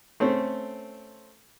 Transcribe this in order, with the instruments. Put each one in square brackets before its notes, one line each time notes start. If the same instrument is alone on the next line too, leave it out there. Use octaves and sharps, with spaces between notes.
[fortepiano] A3 C4 C#4